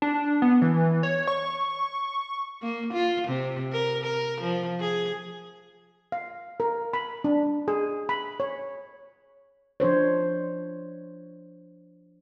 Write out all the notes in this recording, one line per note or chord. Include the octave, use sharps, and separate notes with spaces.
D4
B3
E3
C#5
C#6
A#3
F4
C3
A#4
A#4
F3
G#4
F5
A#4
B5
D4
G#4
B5
C#5
F3 D4 C5 C#5